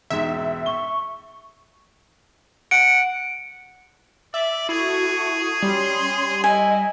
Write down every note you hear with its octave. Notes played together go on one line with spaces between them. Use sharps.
E1 G#2 E5
C#6 G7
F#5 D7
D5 E5
E4 F#4 G#4 A4 C#6
G3 C#4 C6
E4 D#5 G#5